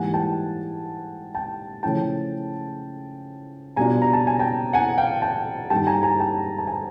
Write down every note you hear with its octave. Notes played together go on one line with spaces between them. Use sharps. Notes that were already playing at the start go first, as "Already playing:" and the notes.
Already playing: G#2 E3 G3 A#3 D#4 F#5 G#5
G5 A5
G5 A5
C#3 F3 A3 C#4 E4 G5 A5
B2 G3 B3 D4 F4 G#5 A#5
A#5
A5
G#5
G5 A5
F#5 G#5
F5 G5
G5 A5
G2 D#3 G3 G5 A5
G#5 A#5
G#5 A#5
G5 A5
A5
G#5 A#5